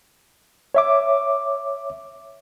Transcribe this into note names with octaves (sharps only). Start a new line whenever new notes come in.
C#5 E5 D6